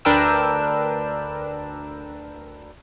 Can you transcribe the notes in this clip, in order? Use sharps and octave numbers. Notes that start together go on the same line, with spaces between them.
D2 D4 A#4 B4 G5 E6